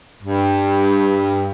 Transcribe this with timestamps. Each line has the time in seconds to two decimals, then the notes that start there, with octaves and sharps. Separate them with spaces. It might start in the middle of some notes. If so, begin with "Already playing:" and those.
0.23 G2